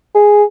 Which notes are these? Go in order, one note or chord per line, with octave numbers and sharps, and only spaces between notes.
G#4